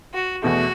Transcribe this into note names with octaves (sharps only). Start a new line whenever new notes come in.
F#4
E2 B2 A3 F#4